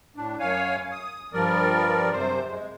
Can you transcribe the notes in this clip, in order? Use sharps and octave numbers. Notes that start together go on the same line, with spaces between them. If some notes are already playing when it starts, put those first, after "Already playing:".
A2 D4
F#2 C#5 F5 G#5
D#6
G2 F3 G3 A#4 D5
F#2 C3 C5
G#3